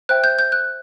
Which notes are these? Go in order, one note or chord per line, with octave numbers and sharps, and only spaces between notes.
C5 E5 G5 F#6
G6
G6
F#6